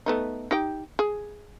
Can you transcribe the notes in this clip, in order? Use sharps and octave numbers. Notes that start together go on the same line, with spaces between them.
A3 B3 D#4
D#4 G4 G5
G#4